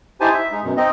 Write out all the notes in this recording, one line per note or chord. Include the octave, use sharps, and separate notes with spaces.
D#4 E4 G4 C5 G#5 A5
E5
G#3 D#4
F#2 B2
C4 D#4 D#5